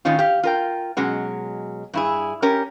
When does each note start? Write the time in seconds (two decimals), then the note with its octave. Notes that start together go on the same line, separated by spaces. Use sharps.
0.05 A2 D#3 C#4 D#4 F4
0.19 G4 F5
0.43 F4 A#4 G5
0.97 B2 F#3 G#3 C#4
1.94 G2 E4 G#4
2.42 C#4 G4 A#4